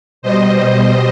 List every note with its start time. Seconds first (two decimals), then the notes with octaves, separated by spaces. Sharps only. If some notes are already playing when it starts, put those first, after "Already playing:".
0.22 B2 G3 C5 D#5